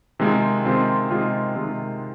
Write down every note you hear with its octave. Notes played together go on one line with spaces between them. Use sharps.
C3 D#3 G#3 C4 F4
C3 D#3 G#3 C4 F4
C3 D#3 G#3 C4 F4
C3 D#3 G#3